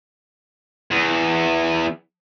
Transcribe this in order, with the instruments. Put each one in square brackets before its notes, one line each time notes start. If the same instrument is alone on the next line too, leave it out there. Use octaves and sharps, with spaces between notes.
[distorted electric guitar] E2